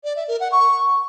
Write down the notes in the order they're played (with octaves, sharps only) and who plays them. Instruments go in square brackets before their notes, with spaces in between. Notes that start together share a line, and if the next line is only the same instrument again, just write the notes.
[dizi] D5
E5
A#4
F#5
C#6